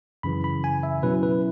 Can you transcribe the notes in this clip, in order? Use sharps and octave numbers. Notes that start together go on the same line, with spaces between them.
F#2 C#3 E3 B5
B5
G#5
E5
B2 F#3 C#4 E4 B4
B4